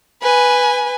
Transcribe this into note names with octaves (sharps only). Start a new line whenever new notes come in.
B4 G#5